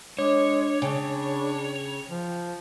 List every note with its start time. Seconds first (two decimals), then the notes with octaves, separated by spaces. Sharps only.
0.19 G#3 D4 C#5 D6
0.82 C#3 D4 G5
2.10 F3